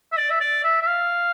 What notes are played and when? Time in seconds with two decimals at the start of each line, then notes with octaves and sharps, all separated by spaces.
0.12 E5
0.18 D5
0.30 E5
0.40 D5
0.64 E5
0.82 E5
0.87 F5